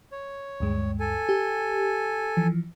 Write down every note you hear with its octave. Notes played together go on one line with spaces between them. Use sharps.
C#5
D2 G2 G#3
A4 G#5
G4
E3 F3